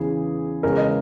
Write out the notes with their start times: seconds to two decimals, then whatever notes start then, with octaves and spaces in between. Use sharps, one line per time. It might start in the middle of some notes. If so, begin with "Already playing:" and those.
Already playing: E2 C#3 E3 G#4
0.63 E2 C#3 G#3 A#4
0.77 D#5